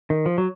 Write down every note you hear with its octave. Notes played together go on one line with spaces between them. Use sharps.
D#3
F3
F#3